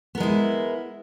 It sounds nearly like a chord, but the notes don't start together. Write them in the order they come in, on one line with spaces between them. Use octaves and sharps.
B3 A#4 G#3 E4